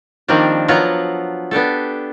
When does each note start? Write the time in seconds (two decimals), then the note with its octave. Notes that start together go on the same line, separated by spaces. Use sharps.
0.28 D#3 F3 G3 A#3 C4 D4
0.68 F3 F#3 B3 F4 F#5 A#5
1.51 B3 D4 G4 A4